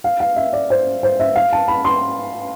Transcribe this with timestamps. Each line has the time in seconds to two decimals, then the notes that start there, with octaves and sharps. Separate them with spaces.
0.04 F5
0.20 F5
0.36 E5
0.53 D5
0.70 C5
1.03 C5
1.20 E5
1.36 F5
1.53 A5
1.68 B5
1.85 C6